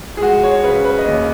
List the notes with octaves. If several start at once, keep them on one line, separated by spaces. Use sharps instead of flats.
G#4
G#3 F#4
C#5
C#3 B4
B4
D#5
D#2 C#5